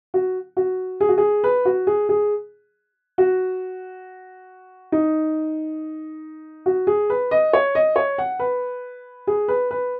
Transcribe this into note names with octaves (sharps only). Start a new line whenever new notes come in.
F#4
F#4
G#4
F#4
G#4
B4
F#4
G#4
G#4
F#4
D#4
F#4
G#4
B4
D#5
C#5
D#5
C#5
F#5
B4
G#4
B4
B4